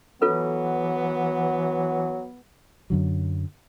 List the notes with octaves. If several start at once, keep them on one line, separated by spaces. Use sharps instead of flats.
E3 F#3 B3 F4 A4 B4
F#2 D3 F#3